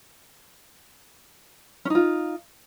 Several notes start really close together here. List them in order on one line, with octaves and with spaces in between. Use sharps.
C#4 D#4 F4